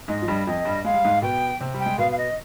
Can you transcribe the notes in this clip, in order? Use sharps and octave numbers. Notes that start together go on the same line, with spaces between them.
G#2 G#3 D#5
F3
G2 G3
F2 F3 D#5
G2 G3
G#3 F5
G3
G#2 G#3
B2 B3 G5
C3 C4
G3
G5
G#3
B2 B3 F5
F5
D#5